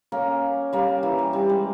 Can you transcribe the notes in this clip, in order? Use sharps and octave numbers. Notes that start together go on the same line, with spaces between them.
A#3 C#4
G3 A#3
E3
G3
G3
G#3